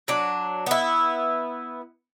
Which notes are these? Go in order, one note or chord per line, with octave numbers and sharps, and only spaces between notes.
F#3 D4
B3 E4